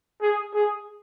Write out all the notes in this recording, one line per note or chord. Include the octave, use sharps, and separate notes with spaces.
G#4
G#4